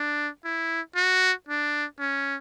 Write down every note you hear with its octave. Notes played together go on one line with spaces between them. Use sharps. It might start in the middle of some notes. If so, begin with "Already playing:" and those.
Already playing: D4
E4
F#4
D4
C#4